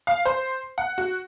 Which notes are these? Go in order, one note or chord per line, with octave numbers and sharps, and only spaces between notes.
F5
C5
F#5
F#4